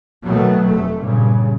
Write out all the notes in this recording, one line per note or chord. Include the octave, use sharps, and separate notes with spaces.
B2 D#3 F#3 A3 B3
F1 A3
G2 A#2 C#3